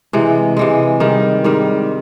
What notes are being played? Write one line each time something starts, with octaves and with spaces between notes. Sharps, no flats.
C3 E3 G#3
C3 E3 G#3
G#2 D#3 G3
G#2 D#3 G3